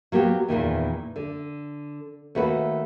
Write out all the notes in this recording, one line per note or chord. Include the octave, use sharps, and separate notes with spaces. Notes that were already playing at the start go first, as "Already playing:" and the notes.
F#3 A#3 B3 G4
E2 A#2 D#3 E3
D3
D#2 A3 F#4 B4